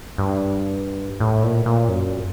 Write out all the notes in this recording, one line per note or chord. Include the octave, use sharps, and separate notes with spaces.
G2
A2
A#2
A#2
F#2